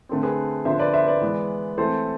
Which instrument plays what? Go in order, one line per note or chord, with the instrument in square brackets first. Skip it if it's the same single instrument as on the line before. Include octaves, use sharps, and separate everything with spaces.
[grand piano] D3 A3 C4
G#4 B4
D3 F3 B3 C5 E5
B4 D5
C5 E5
B4 D5
E3 G#3 B3
E3 A3 C4 A4 C5